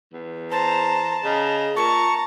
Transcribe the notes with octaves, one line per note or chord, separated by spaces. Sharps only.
E2
C5 A5 A#5
C#3 D#5 A#5
A#2 A5 A#5 C#6